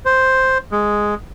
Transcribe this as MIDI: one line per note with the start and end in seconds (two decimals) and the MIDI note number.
0.05 0.58 72
0.72 1.15 56